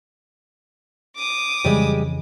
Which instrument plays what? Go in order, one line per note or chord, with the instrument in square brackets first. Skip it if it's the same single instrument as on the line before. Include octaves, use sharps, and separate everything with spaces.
[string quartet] D6 D#6
[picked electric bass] F2 C#3 E3 [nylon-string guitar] G3 G#3